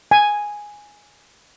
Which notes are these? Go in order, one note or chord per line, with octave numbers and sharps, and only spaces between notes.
G#5